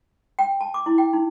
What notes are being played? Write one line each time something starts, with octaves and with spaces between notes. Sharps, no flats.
G5
A5
D6
E4
G5
D#4